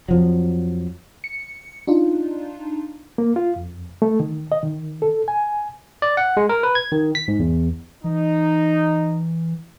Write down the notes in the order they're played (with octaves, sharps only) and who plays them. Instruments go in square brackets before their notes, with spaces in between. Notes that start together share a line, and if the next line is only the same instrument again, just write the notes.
[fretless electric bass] F2 F3 F#3
[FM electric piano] C#7
D4 D#4 F4
[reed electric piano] A#3
F4
F2
A3
D#3
D#5
D#3
A4
G#5
[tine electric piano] D5
F#5
G#3
A#4
B4
G#6
D#3
B6
G#2
E2
[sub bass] E3 [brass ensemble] D#4